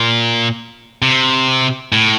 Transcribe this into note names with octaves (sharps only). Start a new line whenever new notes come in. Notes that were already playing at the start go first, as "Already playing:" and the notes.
Already playing: A#2
C3
A2